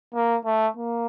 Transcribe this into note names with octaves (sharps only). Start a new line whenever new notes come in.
A#3
A3
A#3